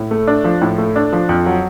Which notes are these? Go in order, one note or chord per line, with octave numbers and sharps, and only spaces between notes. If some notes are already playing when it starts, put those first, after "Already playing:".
Already playing: A2
A3
D4
F3
A2
A3
D4
F3
F2
F#3